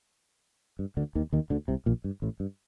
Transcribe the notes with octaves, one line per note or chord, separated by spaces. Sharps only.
G2
D2 D3
D#2 D#3
D#2 D#3
D2 D3
C2 C3
A#1 A#2
G2
A1 A2
G2